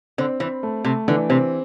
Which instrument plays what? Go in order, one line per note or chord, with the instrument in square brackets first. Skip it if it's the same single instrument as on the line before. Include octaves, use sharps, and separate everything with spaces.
[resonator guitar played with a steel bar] D3 [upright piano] C4
[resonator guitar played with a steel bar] E3 [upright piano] C4
[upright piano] A3
[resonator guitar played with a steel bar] C3 [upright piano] A3
[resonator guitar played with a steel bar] D3 [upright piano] E3
[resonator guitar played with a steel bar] C3 [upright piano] C4